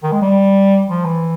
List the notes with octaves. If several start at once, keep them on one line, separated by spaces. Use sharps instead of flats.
D#3
G#3
G3
F3
E3